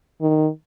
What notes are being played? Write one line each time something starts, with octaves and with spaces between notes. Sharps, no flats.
D#3